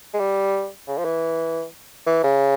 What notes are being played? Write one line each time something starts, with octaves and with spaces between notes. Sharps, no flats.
G#3
G3
C#3
F3
E3
E3
C#3